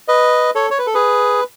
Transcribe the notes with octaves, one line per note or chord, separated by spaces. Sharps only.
B4 D#5
A4 C#5
C#5
B4
A4
G#4 B4